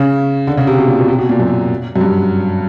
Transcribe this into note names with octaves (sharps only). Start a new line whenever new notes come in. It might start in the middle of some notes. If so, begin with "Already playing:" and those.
Already playing: C#3
D3
C#3
C3
B2
A#2
B2
C3
B2
A#2
F#2
F#2
G2